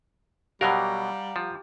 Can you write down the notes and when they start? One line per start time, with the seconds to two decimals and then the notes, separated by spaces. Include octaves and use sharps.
0.61 B2 F#3 G3 G4 A#4 F5 F#5 A#5
1.36 F3